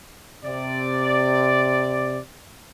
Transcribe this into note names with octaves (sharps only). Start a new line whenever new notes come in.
C3 D5